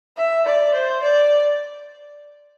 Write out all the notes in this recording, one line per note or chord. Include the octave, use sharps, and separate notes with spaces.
E5
D5
C5
D5